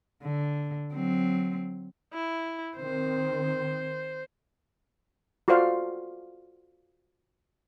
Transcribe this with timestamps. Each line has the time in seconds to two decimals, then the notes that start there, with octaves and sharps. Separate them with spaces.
0.23 D3
0.94 F#3 C4
2.13 E4
2.76 D#3 C4 C5
5.48 F4 F#4 A4 C5 D5 F5